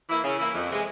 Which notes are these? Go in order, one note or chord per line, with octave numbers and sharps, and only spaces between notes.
E3 A#3 E4
C#3
E3 A#3 E4
F2
C3 E3 G#3